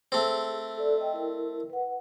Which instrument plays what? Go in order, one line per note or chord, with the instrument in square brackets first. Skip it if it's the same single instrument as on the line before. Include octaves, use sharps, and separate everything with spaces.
[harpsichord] A3 C4 [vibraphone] G#4
[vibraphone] A4 D5
D#5 G5
E4 A#4
B4 F#5